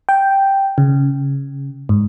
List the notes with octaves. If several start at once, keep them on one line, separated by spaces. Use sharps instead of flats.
G5
C#3
G#2